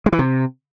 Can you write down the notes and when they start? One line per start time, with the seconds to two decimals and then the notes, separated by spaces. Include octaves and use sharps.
0.06 G#3
0.12 E3
0.19 C3